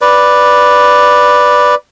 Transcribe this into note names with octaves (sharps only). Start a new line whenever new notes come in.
B4 D5